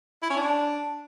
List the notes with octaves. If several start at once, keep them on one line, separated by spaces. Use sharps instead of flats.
E4
C#4
D4